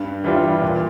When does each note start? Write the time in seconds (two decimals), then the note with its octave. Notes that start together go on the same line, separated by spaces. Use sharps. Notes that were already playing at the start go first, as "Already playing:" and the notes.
Already playing: G2
0.24 E3 G3 D4 F4
0.62 A#2